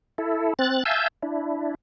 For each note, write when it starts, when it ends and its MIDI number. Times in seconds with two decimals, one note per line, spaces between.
0.18 0.53 64
0.18 0.53 69
0.59 0.84 60
0.59 0.84 90
0.59 0.84 93
0.85 1.08 76
0.85 1.08 77
0.85 1.08 80
0.85 1.08 81
0.85 1.08 88
0.85 1.08 91
1.22 1.75 62
1.22 1.75 64